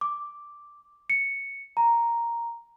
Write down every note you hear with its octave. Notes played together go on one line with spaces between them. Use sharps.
D6
C#7
A#5